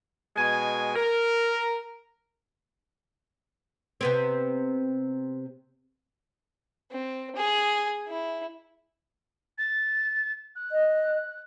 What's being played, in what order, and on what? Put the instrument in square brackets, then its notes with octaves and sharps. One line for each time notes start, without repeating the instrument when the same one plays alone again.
[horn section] B2 G#3 G#5
A#4
[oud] C3 B3 C4
[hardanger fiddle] C4
G#4
E4
[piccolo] A6
F#6
[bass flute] D#5